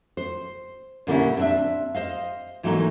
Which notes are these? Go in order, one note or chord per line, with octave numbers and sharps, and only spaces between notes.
C5
A#2 D3 G3 A#3 C#4 E4
C4 D4 E5
C5 D#5 F5
G#2 E3 F#3 A3 A#3 D#4